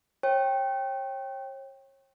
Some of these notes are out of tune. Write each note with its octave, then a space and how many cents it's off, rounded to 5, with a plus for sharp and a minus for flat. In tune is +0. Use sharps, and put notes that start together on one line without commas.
C#5 -35 G5 +0